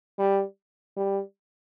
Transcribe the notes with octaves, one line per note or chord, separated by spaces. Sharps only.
G3
G3